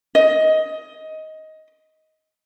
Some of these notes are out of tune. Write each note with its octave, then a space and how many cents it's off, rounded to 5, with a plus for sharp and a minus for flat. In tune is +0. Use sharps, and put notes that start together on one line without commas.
D#5 +15